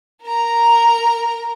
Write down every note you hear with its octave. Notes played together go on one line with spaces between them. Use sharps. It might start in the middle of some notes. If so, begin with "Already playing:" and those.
A#4 A#5